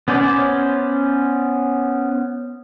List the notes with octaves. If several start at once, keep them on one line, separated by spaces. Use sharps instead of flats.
B3 C#4 C5 D5